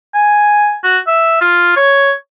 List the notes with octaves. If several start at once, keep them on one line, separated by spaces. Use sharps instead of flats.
G#5
F#4
E5
F4
C#5